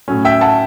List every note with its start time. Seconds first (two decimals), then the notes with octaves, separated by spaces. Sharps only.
0.08 A2 F#3 C#4
0.25 E5 G5
0.41 F#5 A5